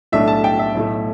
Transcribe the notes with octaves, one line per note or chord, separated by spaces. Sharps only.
B1 A2 A3 D4 E5
A5
G5
E5
B1 A2 A3